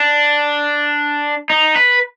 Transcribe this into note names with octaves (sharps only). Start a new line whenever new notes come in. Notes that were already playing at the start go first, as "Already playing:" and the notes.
Already playing: D4
D#4
B4